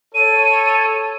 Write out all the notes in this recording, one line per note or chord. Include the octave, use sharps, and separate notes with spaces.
A4 C#5 D#7